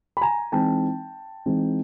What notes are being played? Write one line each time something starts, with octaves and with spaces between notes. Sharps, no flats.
B5
G#5 A#5
E3 G#3 C4 D#4 G5 A5
E3 G#3 C4 D#4